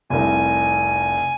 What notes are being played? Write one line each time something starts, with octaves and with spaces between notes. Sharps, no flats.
F1 C2 G#5